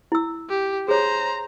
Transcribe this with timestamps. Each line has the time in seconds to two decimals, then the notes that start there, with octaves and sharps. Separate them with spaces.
0.12 E4 E6
0.49 G4
0.88 G#4 C5 C#5 A#5